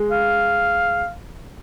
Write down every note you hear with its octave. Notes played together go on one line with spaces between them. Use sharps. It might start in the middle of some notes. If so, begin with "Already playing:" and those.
Already playing: G#3
F5